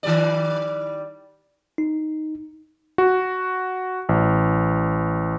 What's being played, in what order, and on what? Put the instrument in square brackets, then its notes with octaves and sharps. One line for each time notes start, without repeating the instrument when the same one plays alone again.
[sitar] D#3 G3 D5
[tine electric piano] D#4
[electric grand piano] F#4
A1